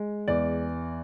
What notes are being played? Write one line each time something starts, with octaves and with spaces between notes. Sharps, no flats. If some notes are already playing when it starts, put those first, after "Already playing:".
Already playing: G#3
E2 D5